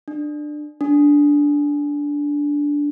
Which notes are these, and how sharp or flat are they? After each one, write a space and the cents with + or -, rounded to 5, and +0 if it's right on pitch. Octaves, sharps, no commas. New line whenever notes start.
D4 +20
D4 -10